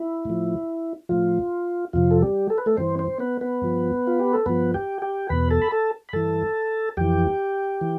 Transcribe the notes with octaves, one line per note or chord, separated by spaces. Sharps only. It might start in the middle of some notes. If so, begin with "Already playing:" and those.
Already playing: E4
A2 F3
A2 F3 F4
F2 C3 F3 F4
A4
G3 G4
A4
B4
A3 A4
G2 E3 C4 C5
C4 C5
B3 B4
B3 B4
G2 F3
F4
G4
A4
G2 F3 B3 B4
G4 G5
G4 G5
E2 B2 B4 B5
A4 A5
B5
A4 A5
B5
G2 E3 A4 A5
F2 E3 G4 G5
E3